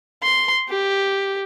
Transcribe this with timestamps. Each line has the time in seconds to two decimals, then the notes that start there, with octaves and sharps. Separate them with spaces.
0.23 C6
0.69 G4